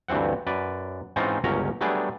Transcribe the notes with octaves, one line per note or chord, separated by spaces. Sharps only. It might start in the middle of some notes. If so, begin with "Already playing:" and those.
D2 G2 E3 C4 F#5
F#2 B4 D5
G#2 E3 C4 C#4 D#4 F4
G1 C#2 F#3 C#4 A#4 A#5
F#3 G3 A3 B3 D4 G#4